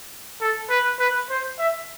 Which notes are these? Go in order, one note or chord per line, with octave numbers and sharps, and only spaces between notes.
A4
B4
B4
C5
E5